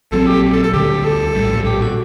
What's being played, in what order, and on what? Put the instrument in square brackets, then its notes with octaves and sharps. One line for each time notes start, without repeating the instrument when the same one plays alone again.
[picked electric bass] A#1 A#2 F#3 C4 [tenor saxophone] A4
[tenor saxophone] G4
A4
A4
[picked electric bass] D2 D3 G3 [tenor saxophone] G4
[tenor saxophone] A4
[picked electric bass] A#1 A2 G3
[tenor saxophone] G4
F#4